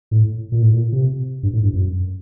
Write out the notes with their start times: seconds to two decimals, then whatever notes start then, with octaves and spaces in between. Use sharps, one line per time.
0.11 A2
0.52 A#2
0.62 A2
0.72 A#2
0.92 C3
1.43 G2
1.53 A2
1.63 G2
1.73 F#2